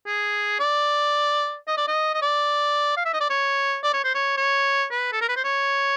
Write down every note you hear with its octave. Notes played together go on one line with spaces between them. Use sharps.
G#4
D5
D#5
D5
D#5
D#5
D5
F5
E5
D#5
D5
C#5
D5
C#5
C5
C#5
C#5
B4
A4
A#4
B4
C5
C#5